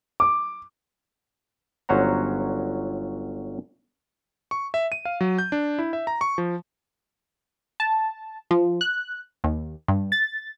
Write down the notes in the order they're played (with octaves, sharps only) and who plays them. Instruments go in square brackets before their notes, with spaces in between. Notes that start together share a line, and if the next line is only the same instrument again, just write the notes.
[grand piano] D6
[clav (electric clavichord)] G1 F#3 C#4 C5 F#5 A#5
[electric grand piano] C#6
E5
D#7
F5
F#3
G6
D4
E4
E5
A#5
C#6
F3
[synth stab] A5
F3
F#6
D#2
G2
A6